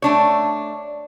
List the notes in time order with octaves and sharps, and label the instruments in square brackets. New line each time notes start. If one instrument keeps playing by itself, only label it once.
[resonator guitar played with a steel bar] A3 D4 C#5